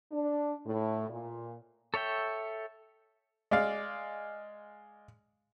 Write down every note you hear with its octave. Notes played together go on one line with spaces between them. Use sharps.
D4
A2
A#2
A4 C#5 E5 G5
G#3 D5 F5